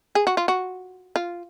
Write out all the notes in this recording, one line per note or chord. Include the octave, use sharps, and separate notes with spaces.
G#4
F#4
F4
F#4
F4